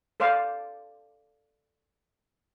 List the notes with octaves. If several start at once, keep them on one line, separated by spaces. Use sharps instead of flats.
A4 C5 D5 F5 A5